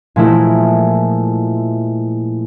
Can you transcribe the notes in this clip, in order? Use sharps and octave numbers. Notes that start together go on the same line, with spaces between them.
A#2 F3 G#3 A3 E4 E7